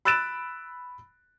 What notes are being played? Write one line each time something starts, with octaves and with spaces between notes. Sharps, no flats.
B5 E6 F#6 A6 D7 E7